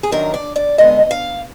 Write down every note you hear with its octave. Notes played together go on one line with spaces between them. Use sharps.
G#4
F#2 D#3 F#3 D4 A#4
D5
D5
F2 D3 G#3 B3 D#5
F5